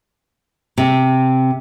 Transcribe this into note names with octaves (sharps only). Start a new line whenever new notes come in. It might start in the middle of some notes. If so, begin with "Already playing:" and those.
C3